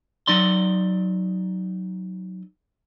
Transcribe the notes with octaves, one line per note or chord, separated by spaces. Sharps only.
F#3 D#4 D5 C6